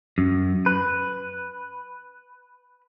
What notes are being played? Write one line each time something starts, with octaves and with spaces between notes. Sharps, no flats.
F#2
B4